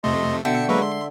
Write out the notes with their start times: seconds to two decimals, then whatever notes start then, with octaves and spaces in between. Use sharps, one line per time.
0.04 F2 C3 A3 D#5 C6
0.45 B2 D3 E5 G5 C#7
0.69 F#3 G#3 A#3 B4 E5 C#6
0.82 E5 C6